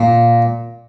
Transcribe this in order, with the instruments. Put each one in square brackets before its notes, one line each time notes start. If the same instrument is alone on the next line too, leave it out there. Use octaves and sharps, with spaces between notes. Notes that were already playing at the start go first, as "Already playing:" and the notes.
Already playing: [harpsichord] A#2